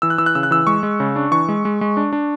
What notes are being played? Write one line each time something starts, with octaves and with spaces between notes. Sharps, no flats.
E3 E6
F#6
E3 E6
F#6
C#3 E6
F#6
E3 E6
G#3 C#6
G#3
C#3
D4
E3 C#6
G#3
G#3
G#3
D4
D4